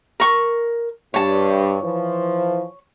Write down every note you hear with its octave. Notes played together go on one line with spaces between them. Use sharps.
A#4 C#6
G2 C#5 A5
E3 F3